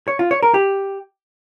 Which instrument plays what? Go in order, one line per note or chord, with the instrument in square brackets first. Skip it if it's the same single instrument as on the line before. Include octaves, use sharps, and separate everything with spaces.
[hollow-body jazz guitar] C#5
F4
C#5
A#4
G4